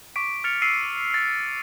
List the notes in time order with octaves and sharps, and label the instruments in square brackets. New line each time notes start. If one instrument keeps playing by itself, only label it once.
[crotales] C#6 D6 B6 D7
F6 A6 C#7 F7
E6 B6 C7 D7 D#7
A6 C7